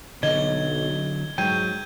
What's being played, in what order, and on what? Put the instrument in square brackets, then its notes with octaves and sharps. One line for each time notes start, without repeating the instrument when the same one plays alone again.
[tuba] B1 [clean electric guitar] D3 F#3 [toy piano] D#5 [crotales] G#6 G7
[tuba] G#2 [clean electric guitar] F#3 [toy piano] G5 [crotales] G6 G#6 D#7